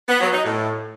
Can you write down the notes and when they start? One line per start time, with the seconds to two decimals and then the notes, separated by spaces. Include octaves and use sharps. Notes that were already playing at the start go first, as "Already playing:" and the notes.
0.09 B3
0.21 F#3
0.33 D#4
0.45 A2